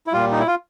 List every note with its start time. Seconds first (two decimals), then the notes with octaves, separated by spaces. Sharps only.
0.07 E4
0.13 A#2 G3 F4
0.32 D#4
0.39 E4
0.47 F4